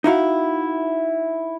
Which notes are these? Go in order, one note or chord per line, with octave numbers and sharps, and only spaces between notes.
D#4 E4 F#4 F5